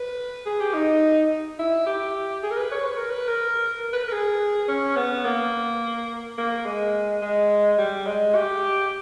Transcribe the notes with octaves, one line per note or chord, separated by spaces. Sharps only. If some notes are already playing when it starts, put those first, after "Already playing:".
Already playing: B4
G#4
G4
D#4
E4
G4
G#4
A#4
B4
C#5
B4
A#4
B4
A#4
B4
A#4
G#4
C#4
B3
A#3
A#3
G#3
G#3
G3
G#3
G4